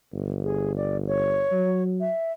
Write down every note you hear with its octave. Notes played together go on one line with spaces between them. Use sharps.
G1
G#4
D5
C#5
F#3
E5